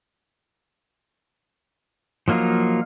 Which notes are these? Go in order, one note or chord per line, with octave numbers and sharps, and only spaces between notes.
F3 F#3 A#3 D#4 F4